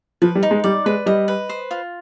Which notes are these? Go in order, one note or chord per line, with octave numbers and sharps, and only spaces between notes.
F3 B4
G3
D#4
G#3
G3 D5
G#3 B4
G3 D#5
B4
C5
F4